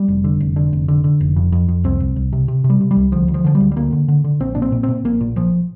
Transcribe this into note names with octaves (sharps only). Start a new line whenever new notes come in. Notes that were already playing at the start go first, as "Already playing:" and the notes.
Already playing: G3
F1
D3
F1
D3
F1
D3
D3
F1
F2
F2
F2
C2 C4
C2
C2
C3
C3
C3
G3
C3
G3
C2
D2 F3
D2
F3
D3 F3
G3
D2
G3
D2 A#3
D3
D3
D3
A#1 C4
A#2 D4
C4
A#2
C4
A#2
A#1 A#3
A#2
A#1 F3